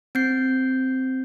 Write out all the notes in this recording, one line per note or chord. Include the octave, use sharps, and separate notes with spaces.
C4 G6 C7